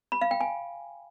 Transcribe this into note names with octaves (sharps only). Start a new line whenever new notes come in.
B5
F5
G5
G#5